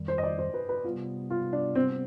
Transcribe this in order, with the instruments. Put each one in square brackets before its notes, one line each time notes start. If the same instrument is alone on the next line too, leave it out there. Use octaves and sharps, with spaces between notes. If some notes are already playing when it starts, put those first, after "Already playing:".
Already playing: [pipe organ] F2 D#3 G3
[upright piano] C5
D#5
D5
C5
B4
B4
[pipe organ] C3 G3 B3 [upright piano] F4
[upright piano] F4
D4
C4